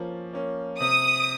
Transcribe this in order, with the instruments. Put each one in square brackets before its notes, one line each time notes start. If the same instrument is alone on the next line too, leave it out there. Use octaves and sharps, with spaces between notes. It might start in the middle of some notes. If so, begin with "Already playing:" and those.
Already playing: [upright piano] F3 A#3 C#4
A#3 C#4
[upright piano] C3 [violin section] D#6